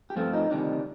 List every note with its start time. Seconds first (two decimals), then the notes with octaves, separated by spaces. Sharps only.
0.10 G4
0.16 G2 F3 A3 C4 F4
0.33 D#4
0.51 D2 C3 D#3 G3 D4